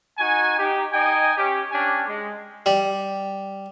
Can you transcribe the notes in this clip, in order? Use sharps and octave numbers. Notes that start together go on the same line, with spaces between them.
D#4 F#4 G#5
D#4 G4
D#4 D#5 G5 G#5
C#4 G4
C#4 D4 G4 G#5
G#3
G3